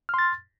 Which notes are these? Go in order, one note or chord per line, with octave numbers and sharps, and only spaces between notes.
C6 F6 A6